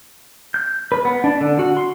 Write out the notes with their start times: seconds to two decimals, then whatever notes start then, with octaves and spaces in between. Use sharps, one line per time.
0.54 G6
0.92 B4
1.05 B3
1.24 D4
1.41 D3
1.59 F#4
1.77 C6